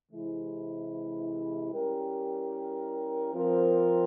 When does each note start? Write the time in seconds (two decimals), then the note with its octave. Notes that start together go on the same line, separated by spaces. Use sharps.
0.12 C3 E3 G#3 E4
1.72 G3 C#4 E4 G4 A#4
3.33 F3 C4 F4 A#4